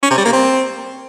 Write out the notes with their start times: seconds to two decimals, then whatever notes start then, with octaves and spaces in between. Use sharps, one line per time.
0.03 C#4
0.10 C3
0.18 G3
0.25 A#3
0.33 C4